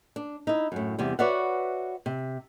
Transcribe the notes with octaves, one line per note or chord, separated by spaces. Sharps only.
D4
D#4 E4
F#2 A2
E2 C3 G3
F#4 B4 C#5 D5 E5 F#5
C3